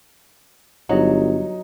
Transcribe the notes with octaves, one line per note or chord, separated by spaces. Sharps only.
G1 F#3 D#4